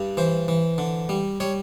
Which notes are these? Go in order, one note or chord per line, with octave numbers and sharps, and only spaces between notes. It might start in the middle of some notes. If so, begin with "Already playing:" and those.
Already playing: G2 G3
E3 C5
E3
D3
G3
G3 C#5